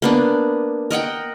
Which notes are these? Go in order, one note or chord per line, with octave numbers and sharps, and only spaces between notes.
A#3 B3 D4
A#4 D#5 F#5 G5